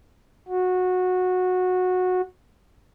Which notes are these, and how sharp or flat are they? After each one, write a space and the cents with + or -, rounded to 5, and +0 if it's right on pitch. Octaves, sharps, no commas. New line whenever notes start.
F#4 -15